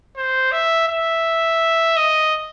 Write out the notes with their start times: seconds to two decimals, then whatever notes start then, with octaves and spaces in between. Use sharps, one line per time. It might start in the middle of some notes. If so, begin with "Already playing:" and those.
0.17 C5
0.52 E5
0.88 E5
1.96 D#5